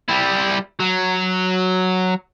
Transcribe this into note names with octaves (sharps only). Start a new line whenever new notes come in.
G3 E4
F#3